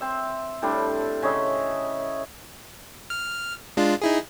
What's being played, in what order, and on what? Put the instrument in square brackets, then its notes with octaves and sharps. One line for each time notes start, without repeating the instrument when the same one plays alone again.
[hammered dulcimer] C4 E5
A2 G3 C4 D4
C#3 C#5 D#5 E5
[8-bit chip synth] F6
G#3 D4 F4
D#4 E4 G#4